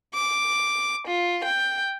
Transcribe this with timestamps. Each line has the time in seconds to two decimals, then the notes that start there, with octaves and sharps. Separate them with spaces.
0.14 D6
1.07 F4
1.44 G5